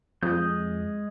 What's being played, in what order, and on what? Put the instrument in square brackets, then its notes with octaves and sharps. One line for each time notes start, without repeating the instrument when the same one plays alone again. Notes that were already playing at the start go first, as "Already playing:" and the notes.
[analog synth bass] F2 [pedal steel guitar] G#3 D#6 G6